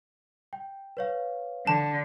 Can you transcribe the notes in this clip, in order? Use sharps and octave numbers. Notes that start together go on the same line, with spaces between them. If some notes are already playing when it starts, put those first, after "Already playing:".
G5
B4 C#5 F5
D3 A5